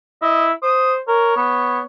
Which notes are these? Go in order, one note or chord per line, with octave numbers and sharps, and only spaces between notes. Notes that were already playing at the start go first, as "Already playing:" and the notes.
E4 D#5
C5 D#6
A#4 C#5
B3